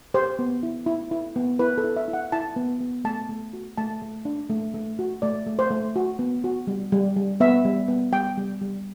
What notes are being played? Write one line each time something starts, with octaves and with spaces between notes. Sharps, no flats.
G4 C5
B3
E4
E4
E4
B3
E4 B4
A4
E4
E5
E4
F#5
E4 A5
B3
B3
A3 A5
A3
F#4
A3 A5
A3
D4
A3
A3
F#4
A3 D5
A3
C5
A3
F#4
B3
F#4
G3
G3
G3
B3 E5
G3
B3
G3 G5
G3
G3